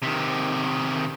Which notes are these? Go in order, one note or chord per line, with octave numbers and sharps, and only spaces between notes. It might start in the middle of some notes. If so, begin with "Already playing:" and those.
C3 D#3